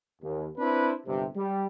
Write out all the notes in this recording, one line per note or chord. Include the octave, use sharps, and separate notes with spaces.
D#2
C4 D4 E4 B4 C5
G1 G2 C3
G3